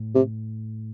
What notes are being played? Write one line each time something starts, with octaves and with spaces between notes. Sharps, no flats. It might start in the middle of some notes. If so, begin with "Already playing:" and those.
Already playing: A2
C3